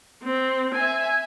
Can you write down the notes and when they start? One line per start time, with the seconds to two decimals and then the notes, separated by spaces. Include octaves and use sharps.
0.23 C4
0.75 E5 G#5